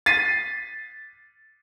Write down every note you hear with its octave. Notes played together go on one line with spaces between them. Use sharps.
A6 B6 C7 D#7